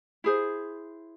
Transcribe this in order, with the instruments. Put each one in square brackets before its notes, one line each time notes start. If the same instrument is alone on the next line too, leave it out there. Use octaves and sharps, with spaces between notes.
[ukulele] E4 G#4 C5